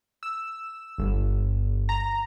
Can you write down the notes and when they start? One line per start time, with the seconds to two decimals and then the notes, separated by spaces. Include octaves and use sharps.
0.23 E6
0.98 G1
1.89 A#5